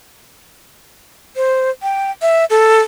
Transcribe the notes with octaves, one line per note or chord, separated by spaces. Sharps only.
C5
G5
E5
A4